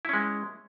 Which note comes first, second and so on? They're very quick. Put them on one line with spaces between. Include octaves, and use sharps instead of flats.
E4 C#4 G#3